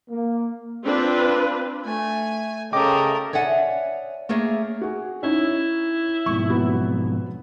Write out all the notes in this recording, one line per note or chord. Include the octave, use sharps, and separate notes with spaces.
A#3
C4 D4 F4 B4
A3 G#5
C#3 A3 G4 G#4 A#4 D#5 G5 D6
C#5 D5 E5 F#5 G#5
A3 A#3 G#4 C#5
F#4 G#4
C#4 D#4 E4
F2 G#2 B2 C#6
F#3 B3 F#4